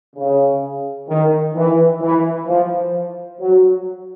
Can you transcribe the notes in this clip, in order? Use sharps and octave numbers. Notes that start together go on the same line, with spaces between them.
C#3
D#3
E3
E3
F3
F#3